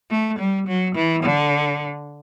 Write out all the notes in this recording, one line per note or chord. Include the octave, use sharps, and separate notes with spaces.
A3
G3
F#3
E3
D3